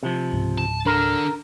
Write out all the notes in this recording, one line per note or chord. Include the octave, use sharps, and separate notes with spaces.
C3 F3
C#2 G#2
A5
D4 A4 A#4